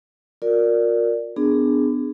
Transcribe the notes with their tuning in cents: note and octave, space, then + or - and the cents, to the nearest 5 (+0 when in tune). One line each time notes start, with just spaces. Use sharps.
F4 +45 A#4 +0 D5 +0
B3 +35 D4 +15 G#4 +0